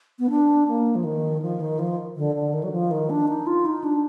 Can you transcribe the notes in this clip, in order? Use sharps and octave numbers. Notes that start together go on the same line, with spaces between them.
B3
D4
A#3
F3
D#3
F3
D#3
F3
D3
D3
D#3
F#3
F3
D#3
D4
D#4
F4
D#4
D4